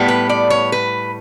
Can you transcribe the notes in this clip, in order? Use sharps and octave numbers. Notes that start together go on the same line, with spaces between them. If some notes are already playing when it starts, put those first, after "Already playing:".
Already playing: A2 G3 B3
B4
D5
C#5
B4